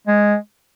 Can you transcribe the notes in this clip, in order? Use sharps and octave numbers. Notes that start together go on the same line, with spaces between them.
G#3